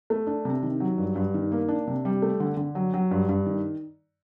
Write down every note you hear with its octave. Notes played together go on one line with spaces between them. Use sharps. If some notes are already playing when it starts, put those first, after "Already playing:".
A3
D4
C3
D#3
F#3
G2
G2
D#3
A#3
D4
C3
G3
A3
D3
D3
F#3
F#3
G2
G2
D#3